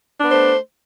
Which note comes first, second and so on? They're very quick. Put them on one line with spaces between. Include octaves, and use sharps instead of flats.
D4 B3 C5 A3